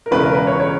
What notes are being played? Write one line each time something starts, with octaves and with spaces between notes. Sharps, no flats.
A#4
E1 E2 C#3 B4
A#4
B4
C#5
C#5